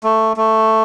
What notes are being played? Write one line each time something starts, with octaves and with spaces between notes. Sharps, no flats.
A3
A3